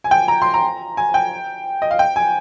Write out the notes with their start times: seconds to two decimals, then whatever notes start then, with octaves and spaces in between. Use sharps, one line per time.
0.04 G#5
0.11 G5
0.28 A#5
0.42 C6
0.54 A#5
0.97 G#5
1.14 G5
1.82 D#5
1.91 F5
1.99 G5
2.16 G#5